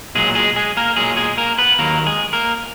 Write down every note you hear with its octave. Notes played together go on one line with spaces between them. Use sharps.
B1 A#2 F#3 G#3 G#4
G#3 G#4
G#3 G#4
A#3 A#4
B1 A#2 F#3 G#3 G#4
G#3 G#4
A#3 A#4
B3 B4
D#2 D#3 F#3 A#3 A#4
G#3 G#4
A#3 A#4